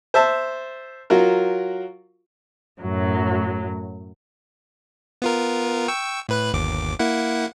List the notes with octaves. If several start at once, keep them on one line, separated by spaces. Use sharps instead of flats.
C5 E5 A5
F#3 F4 F#4 A#4
F#2 A2 F#3
B3 F4 A#4
G5 C#6 E6
A2 B4 F#6
G1 D#2 D6
A#3 E4 F#5